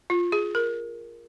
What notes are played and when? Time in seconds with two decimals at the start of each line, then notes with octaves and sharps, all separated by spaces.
0.10 F4
0.32 G#4
0.55 A#4